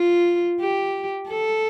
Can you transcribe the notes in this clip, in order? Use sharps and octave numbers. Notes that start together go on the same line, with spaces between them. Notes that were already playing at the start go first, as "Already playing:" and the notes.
Already playing: F4
G4
A4